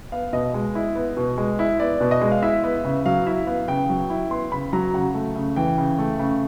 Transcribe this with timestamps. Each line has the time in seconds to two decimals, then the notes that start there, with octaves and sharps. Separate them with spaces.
0.12 B3 F5
0.33 B2 D#5
0.54 G#3
0.75 E4
0.95 B3
1.17 B2
1.38 G#3
1.59 E4
1.80 B3 D5
2.01 B2
2.11 D#5
2.21 G#3
2.31 F5
2.42 E4 E5
2.64 B3
2.85 C#3
3.06 F#3 F5
3.26 E4 E5
3.47 B3 F5
3.68 C#3 G5
3.90 F#3
4.10 E4
4.31 B3 C6
4.52 C#3 B5
4.73 F#3 A#5
4.94 C#3 F#5
5.14 A3
5.36 C#3
5.56 E3 G5
5.78 C#3
5.99 A3
6.20 C#3